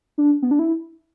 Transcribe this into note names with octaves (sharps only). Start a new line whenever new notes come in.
D4
B3
D4
E4